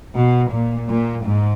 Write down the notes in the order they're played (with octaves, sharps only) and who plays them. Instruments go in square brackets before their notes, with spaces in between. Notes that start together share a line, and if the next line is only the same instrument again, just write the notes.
[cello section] B2
A#2
A#2
G#2